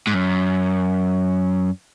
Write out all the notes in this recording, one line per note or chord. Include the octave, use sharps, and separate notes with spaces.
G#2
F#2